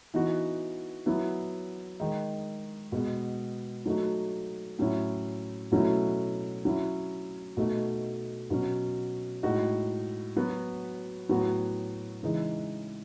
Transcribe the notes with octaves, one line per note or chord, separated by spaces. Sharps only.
E3 B3 D#4 F#4
F#3 B3 E4
D#3 G#3 D#4
B2 G#3 B3
F#3 A3 D#4 F#4
A2 F#3 C#4 E4
B2 F#3 A3 C#4 E4
F#3 C#4 E4
B2 A3 D#4 F#4
B2 F#3 C#4
A2 G#3 D#4 F#4
F#3 B3 F#4
A2 F#3 B3 F#4
C#3 E3 G#3 D#4